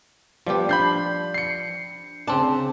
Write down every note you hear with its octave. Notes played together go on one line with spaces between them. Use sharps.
F3 G3 B3 G4
D4 B5 G6 C7
C7 C#7
D2 C#3 C4 D4 A5